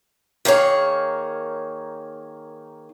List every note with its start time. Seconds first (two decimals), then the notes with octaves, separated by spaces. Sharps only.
0.45 D#3 A#3 G#4 C#5